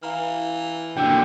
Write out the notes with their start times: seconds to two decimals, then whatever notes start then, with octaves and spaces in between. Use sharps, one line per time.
0.03 E3 F5 A#5 F6
0.97 A#2 D3 F#4 G5 E6